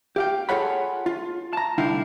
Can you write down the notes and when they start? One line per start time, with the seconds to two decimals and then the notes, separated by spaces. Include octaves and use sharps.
0.16 G4 F5 G5
0.49 F4 G#4 A4 C#5 F#5 B5
1.06 F4
1.53 A5 A#5
1.78 C2 D3 D#4 E4 F5 G5